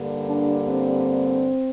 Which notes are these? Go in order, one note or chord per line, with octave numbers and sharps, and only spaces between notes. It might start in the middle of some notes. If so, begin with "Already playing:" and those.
Already playing: G2 D3 G3 A#3
D4
C4